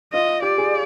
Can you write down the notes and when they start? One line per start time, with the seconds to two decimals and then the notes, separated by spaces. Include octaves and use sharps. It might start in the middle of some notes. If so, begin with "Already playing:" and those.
0.13 F4 D#5
0.42 G4 D5
0.58 G#4